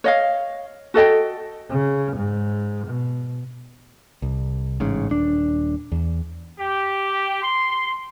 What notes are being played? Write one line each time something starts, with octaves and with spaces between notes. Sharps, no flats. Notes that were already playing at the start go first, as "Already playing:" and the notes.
C#5 D#5 F5
F#4 A4 D#5 G5
C#3
G#2
B2
C2
A1 G#2 C#3
D#1 D4
E2
G4
C6